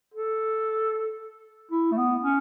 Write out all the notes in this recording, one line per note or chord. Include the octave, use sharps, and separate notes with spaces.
A4
E4
A3
B3
C#4